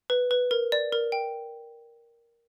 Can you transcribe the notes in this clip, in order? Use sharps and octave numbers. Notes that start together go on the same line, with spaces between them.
B4
B4
A#4
D5
A#4
G5